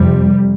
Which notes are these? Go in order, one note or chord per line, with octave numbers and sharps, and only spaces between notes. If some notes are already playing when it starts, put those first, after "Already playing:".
Already playing: F2 C3 G3